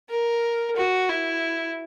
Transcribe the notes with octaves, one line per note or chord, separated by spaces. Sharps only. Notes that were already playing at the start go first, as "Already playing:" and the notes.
A#4
F#4
E4